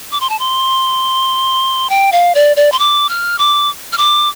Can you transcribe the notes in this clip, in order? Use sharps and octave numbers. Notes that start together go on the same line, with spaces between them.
D6
C6
A5
C6
G5
F5
D5
D5
C6
D6
F6
D6
F6
D6